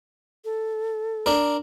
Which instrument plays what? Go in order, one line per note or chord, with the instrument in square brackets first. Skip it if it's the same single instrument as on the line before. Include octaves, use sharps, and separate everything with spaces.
[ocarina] A4
[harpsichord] D4 A#4